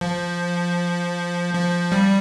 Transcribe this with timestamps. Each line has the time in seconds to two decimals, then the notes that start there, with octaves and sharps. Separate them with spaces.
0.01 F3
1.54 F3
1.92 G3